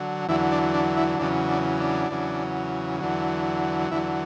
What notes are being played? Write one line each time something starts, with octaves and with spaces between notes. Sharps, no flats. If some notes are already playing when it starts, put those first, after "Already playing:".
Already playing: D3 F#3
E2 D3 F#3 E4
D4
D4
E4
E2 C#3 F#3 D4
D4
D4
E2 C#3 F#3
E2 D3 F#3
E2 D3 F#3 E4